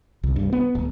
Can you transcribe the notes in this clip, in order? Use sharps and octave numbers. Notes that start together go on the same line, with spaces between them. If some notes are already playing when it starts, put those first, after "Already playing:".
C2
G2
B3
D1